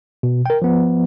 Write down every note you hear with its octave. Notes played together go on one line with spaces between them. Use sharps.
B2
A#4 G5
F3 B3